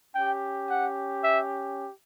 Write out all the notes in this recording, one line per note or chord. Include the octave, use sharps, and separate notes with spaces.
C#4 G4 G5
F#5
E5